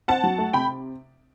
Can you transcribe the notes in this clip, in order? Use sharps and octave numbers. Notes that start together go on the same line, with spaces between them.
C4 F#5 A5
F#3
A3
C3 G5 B5